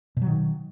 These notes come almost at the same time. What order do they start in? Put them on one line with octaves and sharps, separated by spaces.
B2 F#3 D#3